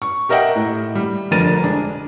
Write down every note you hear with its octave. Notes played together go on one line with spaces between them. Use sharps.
C#6
G4 A#4 D#5 E5 F#5 G5
A2
G3
F1 F2 D3 A#4 A6 D#7
G#3 D4